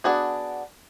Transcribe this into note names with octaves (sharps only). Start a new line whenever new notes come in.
B3 D4 F#4 G#4